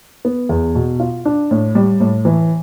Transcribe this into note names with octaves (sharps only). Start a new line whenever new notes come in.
B3
E2
B2
F4
D4
A2
G3
A2
E3